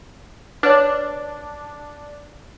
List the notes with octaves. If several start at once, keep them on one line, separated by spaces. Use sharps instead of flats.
D4 B4 C#5